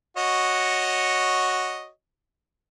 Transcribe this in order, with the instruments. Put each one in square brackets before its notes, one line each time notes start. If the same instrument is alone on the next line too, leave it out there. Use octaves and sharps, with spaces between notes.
[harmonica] F#4 C#5 D#5